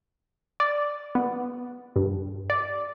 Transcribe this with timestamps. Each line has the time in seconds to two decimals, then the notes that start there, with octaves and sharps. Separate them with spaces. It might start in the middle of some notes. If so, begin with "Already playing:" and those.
0.60 D5
1.15 B3
1.96 G2
2.50 D5